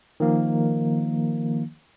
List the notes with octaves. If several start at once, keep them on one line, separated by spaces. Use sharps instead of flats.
D#3 F3 A#3